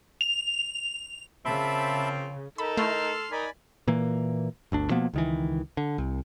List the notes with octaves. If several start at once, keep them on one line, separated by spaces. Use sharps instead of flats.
F7
C#3 F3 A#3 C4 E5 A5 B5
D#4 A4 A#4 B5
A3 E4 C6 F6
D#4 A#4 D5 D#5 G#5 B5
A#2 E3 A#3
G1 D2 D4
B2 F3 A#3 B3
C#2 D#3 E3
D3
C2